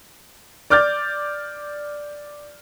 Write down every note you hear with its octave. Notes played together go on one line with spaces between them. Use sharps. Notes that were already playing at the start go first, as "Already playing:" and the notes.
D5 D6 F6 G6 A6